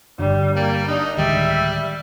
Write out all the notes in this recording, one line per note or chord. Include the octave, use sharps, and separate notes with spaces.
G1 D3 G3
G3 A#3
D4 D#4
D1 D#3 G3 G#3 E5